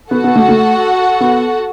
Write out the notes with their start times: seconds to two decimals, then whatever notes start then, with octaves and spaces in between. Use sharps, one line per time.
0.11 B3 F#4 A4 F#5
0.24 B3
0.36 A3
0.48 A3
1.21 B3